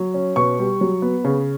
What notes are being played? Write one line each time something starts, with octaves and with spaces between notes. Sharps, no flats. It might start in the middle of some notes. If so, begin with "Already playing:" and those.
Already playing: F#3
C#4
B2 C#6
G3
F#3
B3
C#3